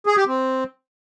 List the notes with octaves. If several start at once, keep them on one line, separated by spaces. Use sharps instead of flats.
G#4
G4
C4